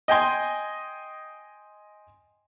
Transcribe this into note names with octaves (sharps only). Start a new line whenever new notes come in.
D#5 G5 G#5 C6